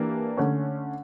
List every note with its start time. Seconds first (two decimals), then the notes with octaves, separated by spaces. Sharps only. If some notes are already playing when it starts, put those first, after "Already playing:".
Already playing: E3 A#3 D4 G4
0.37 D3 A3 C#4